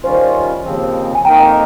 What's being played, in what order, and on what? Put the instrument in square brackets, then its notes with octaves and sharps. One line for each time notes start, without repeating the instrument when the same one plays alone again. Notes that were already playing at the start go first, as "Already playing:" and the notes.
[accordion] D#3 G3 C#4 F4 [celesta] C5
[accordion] D#2 C#3 F3 C4
[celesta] G#5
[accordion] F2 D#3 A#3 D#4 A#4 [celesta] G5 A#5